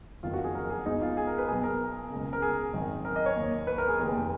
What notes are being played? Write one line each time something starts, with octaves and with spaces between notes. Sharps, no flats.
F#1 F2 D#3 F4
F#4
G#4
A#4
G#4
C#2 B2 D#4
F4
G#4
A#4
B4
B1 B2 G#4
A#4
C#3
C#2
A#4
G#4
G#1 F#2 D#3
A#4
D#5
C#5
D#2 D#3
B4
A#4
G#4
F1 D#2 D#3